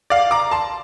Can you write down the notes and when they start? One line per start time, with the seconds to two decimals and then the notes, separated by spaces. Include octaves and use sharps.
0.10 D5 F5
0.31 A#5 D6
0.51 A5 C6